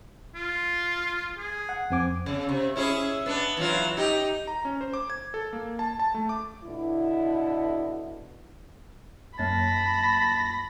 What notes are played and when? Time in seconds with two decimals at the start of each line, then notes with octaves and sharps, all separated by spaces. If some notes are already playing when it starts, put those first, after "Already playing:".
0.35 F4
1.38 G#4
1.69 F#5
1.90 F2 C4 G#5 D6
2.26 C#3
2.49 C3
2.76 C#4 E4 G#4
3.26 B3 D4
3.57 E3 F#3 F4
3.97 D#4 G4
4.47 A#5
4.65 C#4
4.81 C5
4.93 D6
5.10 G#6
5.34 A4
5.53 A#3
5.79 A5
6.00 A5
6.14 A3
6.29 D6
6.65 B2 D3 E4
9.39 F#2 A#3 A5 B5 A#6